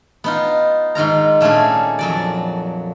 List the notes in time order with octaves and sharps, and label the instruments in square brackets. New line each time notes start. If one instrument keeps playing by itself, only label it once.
[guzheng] B3 D#4 F4
G#2 D#3 F4 A#5
A#2 A3 C#4 D4 G#4
F2 F#3 D5